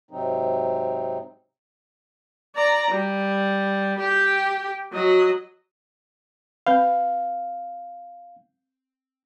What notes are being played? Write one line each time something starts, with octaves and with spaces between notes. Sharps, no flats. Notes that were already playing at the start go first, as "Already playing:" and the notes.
G#2 C3 F#3 C4 D#4
D5 A#5
G3
G4 G5
F#3 D#5
C4 B4 F5 B5